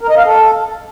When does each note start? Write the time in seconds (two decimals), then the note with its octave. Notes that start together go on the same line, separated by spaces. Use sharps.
0.01 A#4
0.09 D#5
0.17 F5
0.26 A4